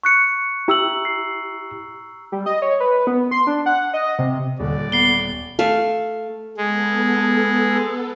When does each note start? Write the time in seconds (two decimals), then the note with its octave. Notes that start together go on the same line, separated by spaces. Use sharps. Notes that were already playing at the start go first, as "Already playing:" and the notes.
0.03 C#6 F#6 C#7
0.68 E4 G4 A#5 E6 F#7
1.05 C7
2.32 G3
2.46 D#5
2.62 C#5
2.80 B4
3.07 B3
3.31 C6
3.47 D4
3.66 F#5
3.94 D#5
4.19 C3
4.60 D#1 D3 D5
4.92 B3 C7 G7
5.59 A3 F5
6.57 G#3 B3 A4